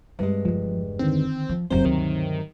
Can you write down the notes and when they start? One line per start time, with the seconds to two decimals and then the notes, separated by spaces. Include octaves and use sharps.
0.19 G2 G#3 C4
0.45 F#1 E2 F3
0.99 D3 D#3 C4
1.49 F3
1.70 F#1 D#2 C3 F#3 C4 C5
1.85 D2 G2 D#3